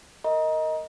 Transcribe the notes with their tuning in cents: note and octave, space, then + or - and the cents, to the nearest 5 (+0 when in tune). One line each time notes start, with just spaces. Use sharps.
A#4 -15 D#5 +15 A#5 +25